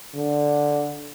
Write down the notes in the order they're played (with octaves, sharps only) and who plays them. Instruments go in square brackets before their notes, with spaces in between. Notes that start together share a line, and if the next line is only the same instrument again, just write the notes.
[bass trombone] D3